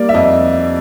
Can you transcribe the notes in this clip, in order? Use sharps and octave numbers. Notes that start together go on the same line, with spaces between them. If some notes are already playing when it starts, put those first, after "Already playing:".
Already playing: G3 A#3 D5
E5
F2 D#5